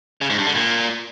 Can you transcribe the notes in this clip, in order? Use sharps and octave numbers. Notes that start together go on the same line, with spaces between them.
C#3
G#2
G2
D3
A#2